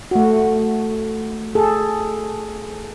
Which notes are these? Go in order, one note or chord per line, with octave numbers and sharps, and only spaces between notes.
A3 F#4
G#4 A4